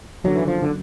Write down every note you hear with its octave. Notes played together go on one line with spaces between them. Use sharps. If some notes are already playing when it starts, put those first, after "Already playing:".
F#1 F#2 D3 F#3
E3
F3
D3